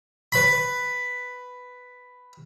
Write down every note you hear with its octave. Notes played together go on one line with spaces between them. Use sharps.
B4 B5